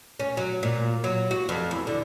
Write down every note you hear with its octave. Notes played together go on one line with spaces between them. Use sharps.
C#4
F#3
A#2
F#3
F#4
F2
E2
D3